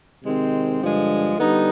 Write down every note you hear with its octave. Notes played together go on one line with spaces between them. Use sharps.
C3 D#3 G#3 C4
G2 D3 F3 G#3
D3 G3 B3 D#4